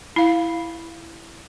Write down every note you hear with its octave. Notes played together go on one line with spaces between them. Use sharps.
E4 F5